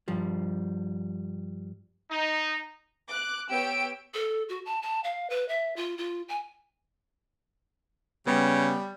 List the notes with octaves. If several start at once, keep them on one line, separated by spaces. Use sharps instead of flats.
G2 F3 G3
D#4
D6 F#6
B3 G4 C#5 G5 E6 D7
A4
F#4
A5
A5
F5
B4
E5
F4
F4
G#5
C#3 G3 B3